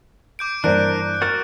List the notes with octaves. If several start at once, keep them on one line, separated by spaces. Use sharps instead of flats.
D6 G6 D7
G2 E3 A#3 D4 A#4 C5 D5 F#6
F#4 A#4 F6 A6